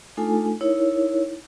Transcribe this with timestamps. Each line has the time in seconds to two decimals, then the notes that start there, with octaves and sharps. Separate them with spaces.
0.17 A3 D4 D#4 F4 A4 G#5
0.61 D#4 E4 A#4 C#5